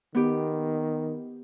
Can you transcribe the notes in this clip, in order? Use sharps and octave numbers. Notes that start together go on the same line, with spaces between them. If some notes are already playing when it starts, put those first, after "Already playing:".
D#3 B3 G4